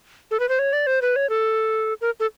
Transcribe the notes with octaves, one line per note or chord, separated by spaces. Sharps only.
A4
B4
C5
C#5
D5
C5
B4
C#5
A4
A#4
A4